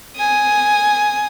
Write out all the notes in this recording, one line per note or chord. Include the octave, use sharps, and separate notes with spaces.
G#5 D#6